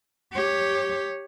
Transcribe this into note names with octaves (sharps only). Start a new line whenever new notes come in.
G4 C#5